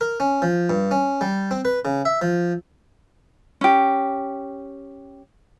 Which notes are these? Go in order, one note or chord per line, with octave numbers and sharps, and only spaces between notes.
A#4
C#4
F3
G2
C#4
G3
C4
B4
C#3
E5
F3
C#4 G4